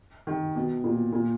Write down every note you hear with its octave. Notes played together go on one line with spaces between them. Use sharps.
D#3
B2
A#2
A#2